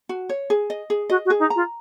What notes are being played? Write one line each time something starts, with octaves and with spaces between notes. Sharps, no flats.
F#4
C#5
G#4
D#5
G#4
F#4 D#5
F#4
G#4
D#4
F4 A#5